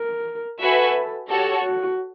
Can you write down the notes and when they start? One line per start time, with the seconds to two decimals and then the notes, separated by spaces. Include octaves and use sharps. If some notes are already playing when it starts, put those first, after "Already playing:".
Already playing: A#4
0.60 F#4 A4 B4 E5 G#5
1.29 F#4 G4 A4 C#5
1.64 F#4